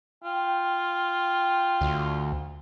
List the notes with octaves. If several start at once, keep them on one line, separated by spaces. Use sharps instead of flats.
F4 G5
D2